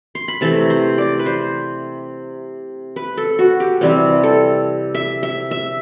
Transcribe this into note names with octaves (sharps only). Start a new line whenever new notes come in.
C6
B5
C3 E3 A3 A5
C5
D5
B4
C5
B4
A4
F#4
G4
C3 E3 G3 C4
A4
E5
E5
E5